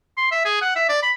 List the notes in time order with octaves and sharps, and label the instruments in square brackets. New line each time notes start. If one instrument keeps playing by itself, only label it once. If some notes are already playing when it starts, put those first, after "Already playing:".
[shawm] C6
E5
G#4
F#5
E5
D5
B5